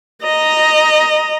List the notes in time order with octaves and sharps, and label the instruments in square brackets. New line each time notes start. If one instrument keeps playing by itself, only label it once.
[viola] D#5 A#5